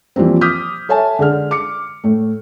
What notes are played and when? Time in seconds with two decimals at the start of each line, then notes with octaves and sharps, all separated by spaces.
0.16 E3 F3 G3 A#3 C4
0.41 D6 D#6 F6 G6 B6
0.89 A4 C#5 E5 G#5 A5
1.19 D3 G#3 G#4 F6
1.51 D6 C#7
2.04 A2 A3